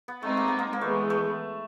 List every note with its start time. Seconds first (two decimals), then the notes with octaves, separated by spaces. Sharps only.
0.08 B3
0.22 G#3 A3 C4 D#4
0.37 A#3
0.48 B3
0.59 A#3
0.73 A#3
0.81 E3 G#3 A3 B3
1.10 A3